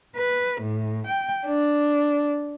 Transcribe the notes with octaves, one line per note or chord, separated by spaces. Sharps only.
B4
A2
G5
D4